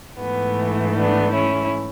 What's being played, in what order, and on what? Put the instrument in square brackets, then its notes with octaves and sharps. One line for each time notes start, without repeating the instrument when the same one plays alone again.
[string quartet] G#2 E3 A3 B3
B3 D4
C#4 E4